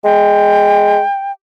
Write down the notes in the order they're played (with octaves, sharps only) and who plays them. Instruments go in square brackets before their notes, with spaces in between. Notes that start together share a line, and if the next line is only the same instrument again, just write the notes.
[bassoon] G#3 [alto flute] G5